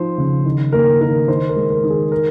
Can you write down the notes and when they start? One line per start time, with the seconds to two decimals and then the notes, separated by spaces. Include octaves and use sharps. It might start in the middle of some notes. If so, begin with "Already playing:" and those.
Already playing: F3 D#4 C5
0.18 C#3
0.45 D#3
0.72 A#3 A#4
1.00 D#3 A#4
1.28 D#3 C5
1.49 A#4
1.56 G#3
1.70 A#4
1.84 D#3
1.90 G#4
2.12 A#4